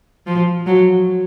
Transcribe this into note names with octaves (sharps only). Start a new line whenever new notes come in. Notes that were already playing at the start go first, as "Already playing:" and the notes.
F3
F#3